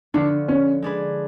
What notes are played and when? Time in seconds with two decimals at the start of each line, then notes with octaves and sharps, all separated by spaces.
0.14 D3 F3 B3 D4 F#4
0.48 C#4
0.82 G#3 D4 G#4 B4